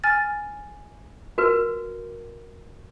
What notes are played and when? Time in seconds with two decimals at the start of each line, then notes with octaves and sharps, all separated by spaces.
0.04 G#5 F6 A6
1.38 F#4 A#4 B4